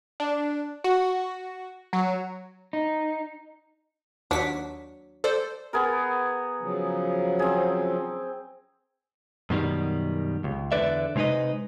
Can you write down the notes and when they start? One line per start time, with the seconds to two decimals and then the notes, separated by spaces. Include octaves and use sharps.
0.20 D4
0.84 F#4
1.93 F#3
2.73 D#4
4.31 D#2 F#3 D4 B6
5.24 A4 C5 D5
5.73 B3 G#4 A#4
6.62 C#3 F3 F#3
7.39 C4 G#4
9.50 F#2 B2 D#3 G3
10.44 C#2
10.72 E2 D3 B4 D5 E5
11.16 C3 G#3 D#4 B4 D#5